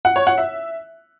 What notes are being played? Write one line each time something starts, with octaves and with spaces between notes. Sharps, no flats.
F#5
C#5
F#5
E5